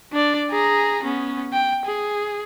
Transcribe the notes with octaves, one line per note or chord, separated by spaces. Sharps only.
D4 D5
G#4 A#5
B3 C#4
G5
G#4